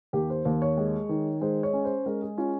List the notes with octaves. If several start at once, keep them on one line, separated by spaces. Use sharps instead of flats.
D#2 G4
C5
D#2
C#5
G#3
D#3
G#3 C5
C#5
C#4
C5
G#3 A#4
G#4
C#4 F4